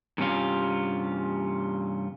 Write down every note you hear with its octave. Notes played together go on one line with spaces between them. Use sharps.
G2 C3 C#4 F4